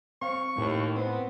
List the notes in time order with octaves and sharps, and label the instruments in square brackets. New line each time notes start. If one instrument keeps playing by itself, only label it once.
[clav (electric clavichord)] C4 F5 [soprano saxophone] C#6
[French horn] D#2 [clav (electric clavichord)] A2
[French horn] B3 [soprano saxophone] C4